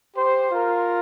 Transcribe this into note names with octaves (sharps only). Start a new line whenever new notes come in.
G4 C5
F4 A#4